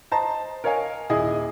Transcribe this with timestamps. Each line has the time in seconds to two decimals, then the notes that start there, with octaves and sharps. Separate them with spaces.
0.11 C5 D#5 A5 A#5
0.64 A#4 C#5 D#5 F5 G#5
1.10 D#1 E4 G#4 D#5